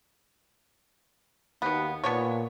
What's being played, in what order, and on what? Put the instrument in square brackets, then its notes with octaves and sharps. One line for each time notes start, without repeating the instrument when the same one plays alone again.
[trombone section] D#2 [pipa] B2 B3
[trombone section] A#2 [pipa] B3 D4 C#5